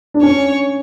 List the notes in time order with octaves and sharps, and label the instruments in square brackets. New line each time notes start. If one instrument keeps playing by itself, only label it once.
[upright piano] D4
[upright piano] C#4 [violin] C#5